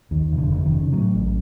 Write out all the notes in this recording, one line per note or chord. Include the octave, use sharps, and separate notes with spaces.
D#2 D#3
F1
D3
F1
D#3
C#3
A2 F#3
A1